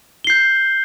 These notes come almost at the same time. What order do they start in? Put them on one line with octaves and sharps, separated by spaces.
G7 C7 G6